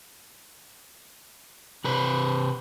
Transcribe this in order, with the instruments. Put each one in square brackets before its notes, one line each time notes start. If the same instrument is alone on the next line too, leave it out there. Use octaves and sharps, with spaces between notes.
[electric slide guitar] C3 B4 C5